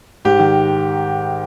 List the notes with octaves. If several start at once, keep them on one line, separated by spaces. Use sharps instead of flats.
G#2 G4
D#3